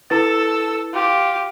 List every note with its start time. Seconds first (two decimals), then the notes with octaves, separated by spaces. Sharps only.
0.10 E4 A4 B4 E6 A6
0.93 F4 G4